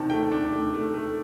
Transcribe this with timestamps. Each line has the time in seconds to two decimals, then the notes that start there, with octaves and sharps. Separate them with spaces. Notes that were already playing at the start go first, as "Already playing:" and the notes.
Already playing: C3 D#3 D4 A5
0.10 A3 G5
0.32 D4
0.52 A3
0.74 A3
0.94 A3